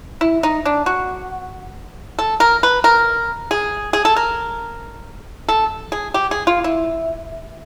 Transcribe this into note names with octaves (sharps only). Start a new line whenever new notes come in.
E4
D#4
D4
F#4
A4
A#4
B4
A#4
G#4
G#4
A4
A#4
A4
G#4
G4
G#4
F4
E4